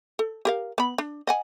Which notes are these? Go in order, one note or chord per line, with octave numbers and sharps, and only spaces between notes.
A4
G4 A#4 F5
B3 B5
D4
D#5 F#5 G#5